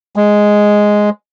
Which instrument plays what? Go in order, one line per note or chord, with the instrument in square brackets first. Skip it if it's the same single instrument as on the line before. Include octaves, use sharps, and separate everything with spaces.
[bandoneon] G#3